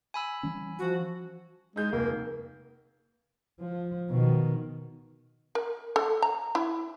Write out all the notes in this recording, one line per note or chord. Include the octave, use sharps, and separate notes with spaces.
G#5 B5 E6
E3 G3 C#4
F3 F#4
G#3 D#4 G6
F1 A#3
F3
B2 D#3
A#4
A4
A#5
E4